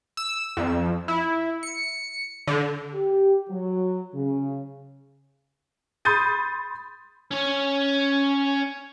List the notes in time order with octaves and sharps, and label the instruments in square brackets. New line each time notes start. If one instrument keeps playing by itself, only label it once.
[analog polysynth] E6
F2
E4
C#7
D3
[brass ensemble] G4
F#3
C#3
[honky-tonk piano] B5 C6 D#6 G6 A6 D#7
[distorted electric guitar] C#4 C#5